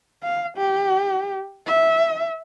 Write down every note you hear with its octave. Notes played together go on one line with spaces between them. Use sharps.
F5
G4
E5